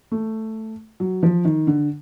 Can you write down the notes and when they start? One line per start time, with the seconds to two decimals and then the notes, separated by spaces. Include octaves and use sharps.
0.12 A3
1.00 F#3
1.23 F3
1.45 D#3
1.67 D3